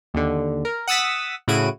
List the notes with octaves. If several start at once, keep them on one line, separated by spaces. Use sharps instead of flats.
D#2 D3
A#4
F#5 D#6 E6 A6 B6
A2 C#3 E4 F#4 D7 D#7